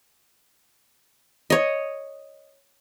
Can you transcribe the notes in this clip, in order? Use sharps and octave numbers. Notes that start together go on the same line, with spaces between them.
C#5 D#5